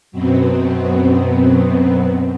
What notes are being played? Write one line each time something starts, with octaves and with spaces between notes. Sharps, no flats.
F#2 B2 F#3 B3 C4